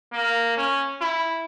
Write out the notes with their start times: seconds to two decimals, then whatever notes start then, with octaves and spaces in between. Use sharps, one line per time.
0.13 A#3
0.57 C#4
1.01 E4